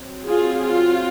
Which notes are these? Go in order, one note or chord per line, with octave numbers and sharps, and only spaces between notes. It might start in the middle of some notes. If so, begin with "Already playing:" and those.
Already playing: F#3 C4
F4 G#4
F4